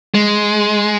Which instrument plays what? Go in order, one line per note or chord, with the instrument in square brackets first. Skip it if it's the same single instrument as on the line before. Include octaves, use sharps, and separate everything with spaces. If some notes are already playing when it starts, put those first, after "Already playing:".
[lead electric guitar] G#3